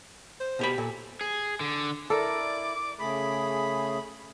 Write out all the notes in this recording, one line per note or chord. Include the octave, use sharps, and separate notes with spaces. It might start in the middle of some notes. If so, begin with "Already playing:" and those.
C5
B2 G4 B5
A#2 A4
G#4
D3
E4 A4 A#4 D5 D6
C#3 A3 G#4 B5